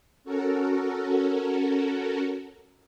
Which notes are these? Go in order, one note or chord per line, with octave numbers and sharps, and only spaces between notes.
C#4 F#4 A4 A#4